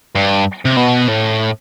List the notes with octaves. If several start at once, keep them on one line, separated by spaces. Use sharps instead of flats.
G2
C3
B2
A2